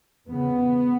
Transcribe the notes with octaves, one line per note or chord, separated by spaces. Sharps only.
E2 C#3 B3